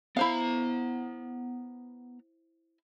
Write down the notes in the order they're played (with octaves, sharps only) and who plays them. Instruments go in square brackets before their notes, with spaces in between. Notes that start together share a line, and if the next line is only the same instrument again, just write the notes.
[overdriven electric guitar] B3 A#5 [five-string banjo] E4 C5 F5